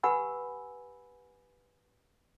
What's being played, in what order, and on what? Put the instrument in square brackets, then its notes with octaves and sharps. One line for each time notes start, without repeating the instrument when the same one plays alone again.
[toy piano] G4 B4 F#5 G#5 B5 E6